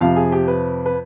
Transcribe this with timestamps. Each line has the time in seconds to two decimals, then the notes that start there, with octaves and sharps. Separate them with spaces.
0.01 F2 C3 F3 F5
0.16 G#4
0.32 G4
0.48 B4
0.86 B4